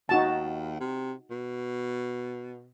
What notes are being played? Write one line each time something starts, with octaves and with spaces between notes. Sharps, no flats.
D#2 D#4 F#4 A5
C3
B2